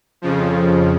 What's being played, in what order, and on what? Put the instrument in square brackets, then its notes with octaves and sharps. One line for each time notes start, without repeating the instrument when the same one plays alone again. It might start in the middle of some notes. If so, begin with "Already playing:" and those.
[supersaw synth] F2 C#3 F3